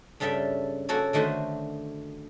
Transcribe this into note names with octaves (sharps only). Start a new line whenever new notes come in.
G2 C#3 G3 A4 E5 G5
A#3 F#4 G#4 A4 C#5
D3 D#3 A3 F#4 C5